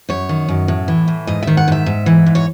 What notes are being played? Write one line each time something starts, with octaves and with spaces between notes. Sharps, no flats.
F#2 C#5
D#3
F#2
A2
E3
A2
G#2 D#5
D#3 E5
F#5
G#2 E5
G#2
E3
G#2
C#5